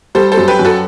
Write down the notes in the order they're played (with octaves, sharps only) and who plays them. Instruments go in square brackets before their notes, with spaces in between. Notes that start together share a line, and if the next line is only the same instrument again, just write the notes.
[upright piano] G3 [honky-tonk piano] A4 C5
[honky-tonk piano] A4 C5
[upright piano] F#2
[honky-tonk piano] G4 B4
[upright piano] F#2
[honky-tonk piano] F#4 A4